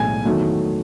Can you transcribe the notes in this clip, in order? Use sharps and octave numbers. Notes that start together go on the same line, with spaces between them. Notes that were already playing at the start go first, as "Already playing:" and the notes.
Already playing: B1 A2 G#3 G#5
E2 D#3 F#3 A3